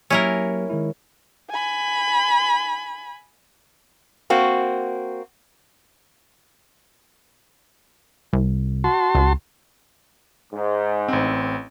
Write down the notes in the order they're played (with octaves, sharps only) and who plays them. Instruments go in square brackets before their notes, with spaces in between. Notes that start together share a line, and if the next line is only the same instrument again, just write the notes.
[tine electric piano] F#3 A#3 G4 [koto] C#4 E4 A#4
[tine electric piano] D#3 G#3 E4
[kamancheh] G#5 B5
[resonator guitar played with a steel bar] A#3 C4 F#4
[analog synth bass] C2
[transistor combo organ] F#4 A5 C6
[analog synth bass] C#2
[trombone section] G#2
[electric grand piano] A1 C4